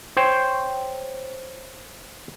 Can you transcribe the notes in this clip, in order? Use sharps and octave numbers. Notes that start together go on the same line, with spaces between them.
C5 C#5 G5